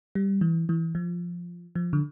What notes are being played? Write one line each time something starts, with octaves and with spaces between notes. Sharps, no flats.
G3
E3
E3
F3
F3
D3